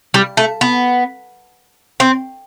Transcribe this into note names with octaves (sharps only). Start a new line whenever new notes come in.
G3
A3
B3
C4